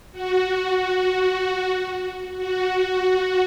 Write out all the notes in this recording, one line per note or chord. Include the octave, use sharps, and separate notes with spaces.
F#4
F#4
F#4